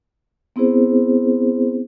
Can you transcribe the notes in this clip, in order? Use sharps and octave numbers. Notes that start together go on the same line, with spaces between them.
B3 C4 E4 G#4 C5